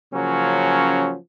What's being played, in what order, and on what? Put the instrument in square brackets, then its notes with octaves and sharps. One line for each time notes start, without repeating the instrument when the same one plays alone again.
[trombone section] C#3 F3 F#3 A#3 C#4